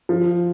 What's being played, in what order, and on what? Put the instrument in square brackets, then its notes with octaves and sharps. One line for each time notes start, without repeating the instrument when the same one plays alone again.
[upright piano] F3